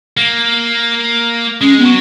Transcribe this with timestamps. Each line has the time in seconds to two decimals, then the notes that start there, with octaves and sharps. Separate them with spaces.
0.17 A#3
1.61 G#3 C#4
1.79 B3
1.85 F#3